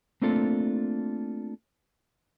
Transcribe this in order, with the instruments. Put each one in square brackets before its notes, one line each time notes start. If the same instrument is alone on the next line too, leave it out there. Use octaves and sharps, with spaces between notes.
[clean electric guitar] A3 A#3 C4 D4 F4 A4